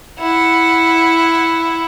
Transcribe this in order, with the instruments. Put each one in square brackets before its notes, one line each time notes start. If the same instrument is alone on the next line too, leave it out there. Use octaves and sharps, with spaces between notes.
[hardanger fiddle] E4 F#5